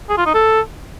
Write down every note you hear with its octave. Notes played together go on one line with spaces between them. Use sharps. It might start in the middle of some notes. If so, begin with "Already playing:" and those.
G#4
F4
D#4
A4